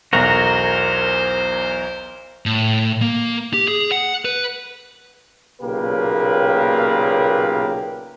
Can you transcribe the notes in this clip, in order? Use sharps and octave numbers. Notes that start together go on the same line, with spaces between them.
B1 E2 F#4 A#4 C5
A2
A#3
G4
G#4
F#5
B4
B1 A#2 C#3 A#3 G4 B4